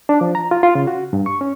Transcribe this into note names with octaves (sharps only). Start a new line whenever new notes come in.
D4
F3
A#5
F4
F4
C#3
F#4
G2
C#6
C#4